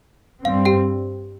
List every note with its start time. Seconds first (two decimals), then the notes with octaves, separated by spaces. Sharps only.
0.45 G2 G3 C4 F5
0.65 G4 G5